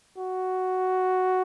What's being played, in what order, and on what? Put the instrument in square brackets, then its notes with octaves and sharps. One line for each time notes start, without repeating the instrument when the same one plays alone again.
[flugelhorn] F#4